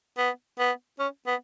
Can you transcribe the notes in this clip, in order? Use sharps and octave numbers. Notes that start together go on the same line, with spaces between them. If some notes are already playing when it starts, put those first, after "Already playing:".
B3
B3
C#4
B3